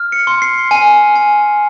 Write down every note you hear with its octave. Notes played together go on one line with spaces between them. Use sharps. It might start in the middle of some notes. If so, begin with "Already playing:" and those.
Already playing: F6
C#7
C6
C7
G#5
G#5